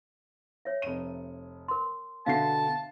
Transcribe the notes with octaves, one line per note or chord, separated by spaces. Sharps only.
C#5 E5
F1 D#7
A#4 C6
B2 D3 D4 E5 F5 A5 C7